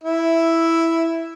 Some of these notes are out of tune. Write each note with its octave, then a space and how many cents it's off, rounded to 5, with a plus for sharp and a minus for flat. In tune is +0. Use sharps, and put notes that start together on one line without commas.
E4 +0 E5 +0